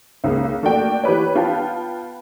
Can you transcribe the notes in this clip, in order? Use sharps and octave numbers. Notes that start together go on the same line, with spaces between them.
C#2 C#3 A#3
A3 A#3 F#4 D5 G5
E3 G4 B4 C#5
B3 F4 B4 F5 G5 A5